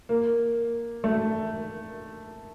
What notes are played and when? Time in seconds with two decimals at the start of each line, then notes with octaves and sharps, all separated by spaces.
0.09 A#3
1.04 A3